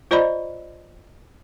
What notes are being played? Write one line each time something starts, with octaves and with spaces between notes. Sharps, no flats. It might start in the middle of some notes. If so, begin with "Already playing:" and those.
F4 C5 D5 D#5 A#5 B5